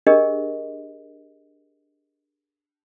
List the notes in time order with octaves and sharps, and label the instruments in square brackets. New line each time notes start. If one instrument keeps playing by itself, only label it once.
[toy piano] D4 G4 G#4 A#4 D#5